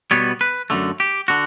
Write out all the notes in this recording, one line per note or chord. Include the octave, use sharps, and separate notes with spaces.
B2 G3 B3 C#5
B4
F#2 D3 A3
G4
D3 F#4